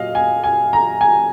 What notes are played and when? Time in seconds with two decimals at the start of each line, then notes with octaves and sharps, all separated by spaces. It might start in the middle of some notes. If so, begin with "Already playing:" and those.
Already playing: A#2 F#3 D#5 F5
0.15 G#5
0.44 G#5
0.73 A#5
1.01 G#5